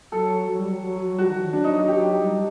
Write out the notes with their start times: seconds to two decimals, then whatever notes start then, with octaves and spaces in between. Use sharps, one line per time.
0.12 F#3 A4
0.48 F#3
0.59 G3
0.72 F#3
0.83 F#3
1.01 F#3
1.18 G3 F#4
1.29 D#3
1.42 F#3
1.53 F#3 D4
1.64 D#4
1.77 D#4
1.88 G4
2.23 G3